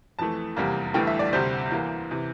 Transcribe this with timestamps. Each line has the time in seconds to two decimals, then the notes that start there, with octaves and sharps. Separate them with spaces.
0.19 F2 E3 A3 A5
0.56 F1 E2 C3 G3 A#3
0.94 G1 G2 E3 A3 G5
1.07 E5
1.19 D5
1.33 D2 C3 G3 C5
1.71 E2 E3 A#3
2.11 C3 E3